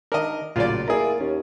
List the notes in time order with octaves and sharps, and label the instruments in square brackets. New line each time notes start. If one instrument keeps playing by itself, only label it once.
[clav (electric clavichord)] D#3 D4 [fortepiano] A#4 D#5
[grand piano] A1 [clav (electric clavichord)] A#2 C#3 F#3 [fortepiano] F4 D5
[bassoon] A#3 [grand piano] E4 G#4 [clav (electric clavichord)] A#5
[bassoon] D#2 [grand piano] C#4